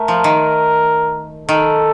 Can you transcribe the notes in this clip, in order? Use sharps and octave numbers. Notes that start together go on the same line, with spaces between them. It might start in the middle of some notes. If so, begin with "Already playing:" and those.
Already playing: A3 A#4
F3
D#3
D#3 A4